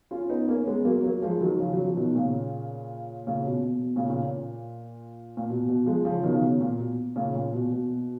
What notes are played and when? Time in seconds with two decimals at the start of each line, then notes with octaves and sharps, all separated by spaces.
0.11 C#4 F4
0.29 B3 D#4
0.48 A#3 C#4
0.67 G#3 B3
0.85 F#3 A#3
1.04 F#3 A#3
1.22 F3 G#3
1.41 D#3 F#3
1.60 C#3 F3
1.73 F#3
1.84 F3
1.97 B2 D#3
2.15 A#2 C#3
3.27 A#2 C#3
3.45 B2
3.63 B2
3.82 B2
3.96 A#2 C#3
4.10 A#2 C#3
4.24 A#2
5.37 A#2
5.50 B2
5.68 B2
5.86 F3 G#3
6.05 C#3 F3
6.23 B2 D#3
6.33 C#3
6.42 B2
6.61 A#2
6.79 B2
7.16 A#2 C#3
7.35 A#2
7.54 B2
7.72 B2